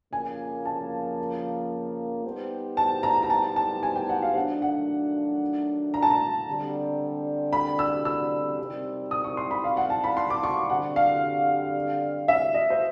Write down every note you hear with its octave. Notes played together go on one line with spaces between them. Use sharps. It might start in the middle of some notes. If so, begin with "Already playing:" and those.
F2 C#3 F3 A#3 G#5
A5
G3 B3 D#4 G4 C5
A5
A#5
A#5
A5
A5
G#5
G5
F#5
F5
D#3 F#3 A3 D4 F#5
F#5
A#5
A5
A#5
D3 G3 C4
B5
E6
E6
C3 D#3 G3 C4
D#6
C#6
C6
B5
F5
F#5
A5
B5
C6
D6
C#6
D3 G3 C4 F#5
F5
E5
D#5
C5